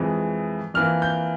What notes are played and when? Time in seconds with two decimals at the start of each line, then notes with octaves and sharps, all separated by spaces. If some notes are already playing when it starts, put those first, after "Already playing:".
Already playing: F2 E3 G#3
0.74 F2 E3 A#3 F6
1.02 G6